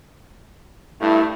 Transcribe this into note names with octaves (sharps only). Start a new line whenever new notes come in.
G2 A3 E4